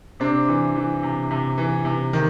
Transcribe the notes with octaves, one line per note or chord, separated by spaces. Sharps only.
C3 C4 D4
E3
E3
C3
C3
E3
C3
D#3